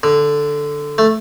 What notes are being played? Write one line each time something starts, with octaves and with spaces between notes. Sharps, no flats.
D3
A3